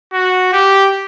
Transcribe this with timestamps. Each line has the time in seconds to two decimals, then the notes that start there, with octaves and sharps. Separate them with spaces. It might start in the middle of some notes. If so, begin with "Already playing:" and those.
0.13 F#4
0.53 G4